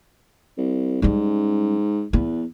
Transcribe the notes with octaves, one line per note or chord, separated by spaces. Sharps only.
C2
G#2 G3 C#4
E2 B3